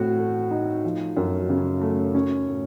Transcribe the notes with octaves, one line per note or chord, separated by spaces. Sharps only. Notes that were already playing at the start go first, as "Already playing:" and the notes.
Already playing: A2 C4 F#4
A3
D#4
F3
F#2
C#3
A3
C#4
A2